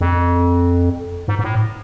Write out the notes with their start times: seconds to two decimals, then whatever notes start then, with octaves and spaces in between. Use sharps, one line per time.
0.01 F2
1.28 G#2
1.39 G#2
1.44 A2